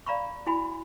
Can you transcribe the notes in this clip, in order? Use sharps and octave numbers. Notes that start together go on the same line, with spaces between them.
D5 F5 A#5 B5 C#6
E4 F#4 G#5 B5